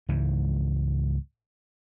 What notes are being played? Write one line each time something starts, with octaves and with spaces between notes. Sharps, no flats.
C#2 G#2 E3